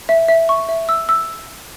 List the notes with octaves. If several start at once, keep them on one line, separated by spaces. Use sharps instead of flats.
E5
E5
C#6
E5
E6
E6